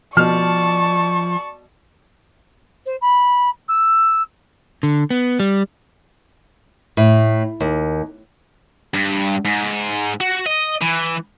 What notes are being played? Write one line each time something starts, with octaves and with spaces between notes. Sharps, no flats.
B2 F3 D5 A5 C#6 F6
C5
B5
E6
D3
B3
G3
A2
D#2
G2
G#2
F#4
D#5
E3